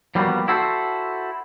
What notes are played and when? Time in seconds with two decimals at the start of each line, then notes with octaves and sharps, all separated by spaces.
0.15 F3 G3 A#3 B3 F4 F#4
0.48 E4 F#4 A4 C5